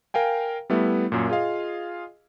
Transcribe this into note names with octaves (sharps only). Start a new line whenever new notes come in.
A#4 F5 G5 G#5
G3 A3 B3 E4
F#2 A#2
F4 G#4 D#5 F5